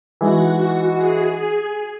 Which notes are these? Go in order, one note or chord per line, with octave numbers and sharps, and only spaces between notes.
E3 G#3 D#4 F#4
G#4